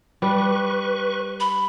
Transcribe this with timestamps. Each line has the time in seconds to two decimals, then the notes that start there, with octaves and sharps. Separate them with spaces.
0.22 G3 B4 C#6
1.40 B5